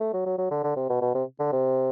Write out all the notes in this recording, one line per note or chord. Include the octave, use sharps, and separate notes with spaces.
A3
F#3
F#3
F#3
D3
D3
C3
B2
B2
C3
D3
C3